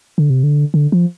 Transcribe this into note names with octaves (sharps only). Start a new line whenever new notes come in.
D3
C3
D3
D3
F3